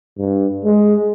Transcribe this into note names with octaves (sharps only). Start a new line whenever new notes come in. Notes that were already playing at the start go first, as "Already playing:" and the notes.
G2
G#3